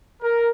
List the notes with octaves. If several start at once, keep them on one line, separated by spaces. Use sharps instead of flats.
A#4